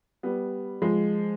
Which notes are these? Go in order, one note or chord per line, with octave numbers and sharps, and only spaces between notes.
G3 B3
F3 G#3